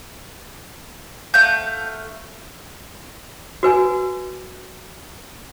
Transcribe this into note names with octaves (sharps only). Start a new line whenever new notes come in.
A3 F5 F#5 G6
F#4 B4 G#5